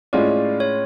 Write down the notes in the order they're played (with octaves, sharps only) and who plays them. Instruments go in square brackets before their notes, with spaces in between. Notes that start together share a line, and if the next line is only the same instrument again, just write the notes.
[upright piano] A2 G#3 C#4 F4 [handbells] D5
[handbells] C#5